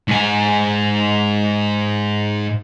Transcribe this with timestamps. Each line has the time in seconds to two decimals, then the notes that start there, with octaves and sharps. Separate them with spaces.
0.08 G#2 G#5